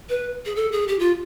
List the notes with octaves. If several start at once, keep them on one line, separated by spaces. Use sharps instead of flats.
B4
G#4
A4
G#4
G4
F4